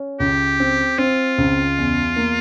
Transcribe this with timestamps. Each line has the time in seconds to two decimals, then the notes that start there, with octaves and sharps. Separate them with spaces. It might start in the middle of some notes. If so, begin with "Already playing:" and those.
Already playing: C#4
0.20 C#2 G4
0.60 C4
0.98 C4 F4
1.38 C#2
1.78 E2
2.16 A#3